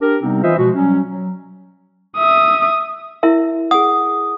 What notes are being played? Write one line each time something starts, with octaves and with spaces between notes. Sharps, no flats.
D4 G4 A#4
C3 G3 B3 C4 D#4
E3 F4 C5 D#5 E5
B2 F3 G#3 F#4
F#3 G3 C#4
F#3
E5 D#6
E4 A#4 E5
G#4 F#5 D#6